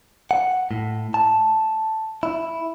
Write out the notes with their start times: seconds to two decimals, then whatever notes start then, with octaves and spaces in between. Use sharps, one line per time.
0.31 F#5
0.71 A2
1.14 A5
2.23 E4